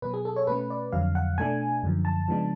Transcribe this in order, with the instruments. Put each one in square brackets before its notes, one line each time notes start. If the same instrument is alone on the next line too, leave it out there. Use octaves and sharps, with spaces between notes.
[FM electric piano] B2 F#3 B3 B4
G#4
A4
C#5
B2 A3 C#4 B4
D5
F2 D3 F#3 F5
F#5
B2 A3 D4 G#5
F#2 D3 F3
A5
C#3 F3 G#3 B3 D4